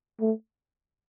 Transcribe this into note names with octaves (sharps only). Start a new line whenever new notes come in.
A3